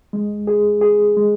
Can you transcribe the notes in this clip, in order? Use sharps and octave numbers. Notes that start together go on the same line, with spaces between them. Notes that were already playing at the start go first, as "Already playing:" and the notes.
G#3
G#4
G#4
G#3